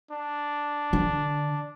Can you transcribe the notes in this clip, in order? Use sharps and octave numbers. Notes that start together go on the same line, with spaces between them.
D4
D3